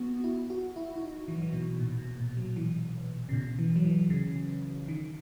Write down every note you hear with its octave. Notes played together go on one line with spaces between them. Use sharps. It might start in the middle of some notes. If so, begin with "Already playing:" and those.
Already playing: B3 F#4
E4
F#4
E4
E4
D#4
E3
F#3
E3
B2
A#2
B2
A#2
F#3
E3
C#3
B2
E3
F#3
E3
C#3
D#3